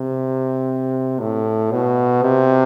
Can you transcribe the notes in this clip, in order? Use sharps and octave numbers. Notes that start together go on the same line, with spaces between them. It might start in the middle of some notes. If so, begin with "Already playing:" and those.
Already playing: C3
A2
B2
C3